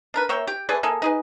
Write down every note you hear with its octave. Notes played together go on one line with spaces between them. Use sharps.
D4 A#4 B4
A#3 C#5 E5 G5
G4 G5
A3 G#4 B4 D5
A#3 G#4 A4
D#4 G#4 B4